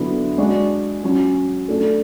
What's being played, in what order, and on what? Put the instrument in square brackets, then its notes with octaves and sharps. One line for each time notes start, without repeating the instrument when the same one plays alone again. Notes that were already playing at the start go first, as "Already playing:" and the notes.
Already playing: [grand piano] D3 F#3 B3 E4 B4
G#3 D4 F#4
F#3 C#4 F#4
A3 D4 A4